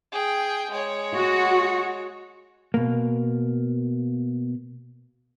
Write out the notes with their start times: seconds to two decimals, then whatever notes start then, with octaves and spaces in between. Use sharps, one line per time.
0.12 G#4 G5
0.71 G#3 C#5
1.16 F#4
2.74 B2 A#3